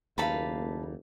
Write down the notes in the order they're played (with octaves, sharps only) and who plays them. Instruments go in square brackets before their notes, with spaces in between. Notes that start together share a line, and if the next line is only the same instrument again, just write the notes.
[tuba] F#1 [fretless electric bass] D#2 [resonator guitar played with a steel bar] A3 A#3 F5 [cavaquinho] B4 A5 B5